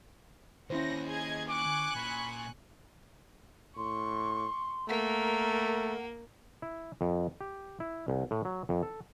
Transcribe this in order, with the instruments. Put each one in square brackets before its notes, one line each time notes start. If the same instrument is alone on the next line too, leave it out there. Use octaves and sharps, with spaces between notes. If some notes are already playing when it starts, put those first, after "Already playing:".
[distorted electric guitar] D#2 [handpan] C#4 E4 C5 [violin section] F#5 A#6
[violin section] G#4 D#5 G#6
[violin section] G#5 C#6 F#6 [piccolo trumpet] D6
[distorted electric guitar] A#2 [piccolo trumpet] B5
[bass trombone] A2 [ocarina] C6 [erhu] C#6
[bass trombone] A3 [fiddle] A#3 [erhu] A#4 [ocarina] F#5
[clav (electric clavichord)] E4
F2
G4
E4
C2
A2
F#3
F2
A4